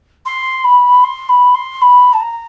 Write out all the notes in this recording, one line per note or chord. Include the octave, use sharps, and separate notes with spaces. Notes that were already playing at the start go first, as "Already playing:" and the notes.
C6
B5
C6
B5
C6
B5
A5
A#5